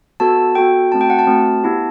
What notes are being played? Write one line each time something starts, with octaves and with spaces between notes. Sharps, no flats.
B3 F#4 A4 A5
B3 F#4 A4 G5
A3 C4 F#4 A5
G5
F#5
A5
A3 C4 F#4
B3 E4 G4